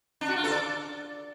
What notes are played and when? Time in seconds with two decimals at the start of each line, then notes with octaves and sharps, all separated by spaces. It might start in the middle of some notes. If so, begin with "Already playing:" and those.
0.21 D4
0.29 F#4
0.36 F4
0.44 A4
0.51 D5